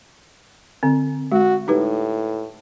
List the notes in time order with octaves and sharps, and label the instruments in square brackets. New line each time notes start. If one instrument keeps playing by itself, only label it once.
[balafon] D3 C4
[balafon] G#3 [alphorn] F#4
[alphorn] A2 [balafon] D#4 G4 B4